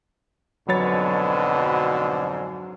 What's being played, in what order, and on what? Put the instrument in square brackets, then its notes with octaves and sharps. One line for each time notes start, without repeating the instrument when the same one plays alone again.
[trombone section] F2 G#2 D3 [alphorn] B2 [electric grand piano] F#3 C#5 A6 [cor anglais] B4